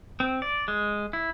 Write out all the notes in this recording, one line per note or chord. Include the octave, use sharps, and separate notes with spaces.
C4
D5
G#3
E4